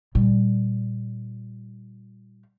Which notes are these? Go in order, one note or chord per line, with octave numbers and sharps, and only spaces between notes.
A#2 G3